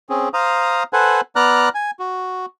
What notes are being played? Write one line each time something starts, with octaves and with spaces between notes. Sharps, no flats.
C4 C#4 G#4
C5 F5 A#5 D#6
A4 B4 C5 F#5 G#5
B3 D5 A#5 F6 F#6
G#5
F#4